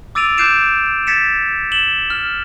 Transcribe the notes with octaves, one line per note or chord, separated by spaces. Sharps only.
D6 E6 A6 D7 D#7 F7
D6 F#6 G6 C7 D7 E7
G#6 A6 B6 C#7 E7
E7 F#7 G7
F6